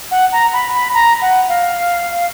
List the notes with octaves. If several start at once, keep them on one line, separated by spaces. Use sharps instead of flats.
F#5
A#5
B5
B5
A#5
F#5
F5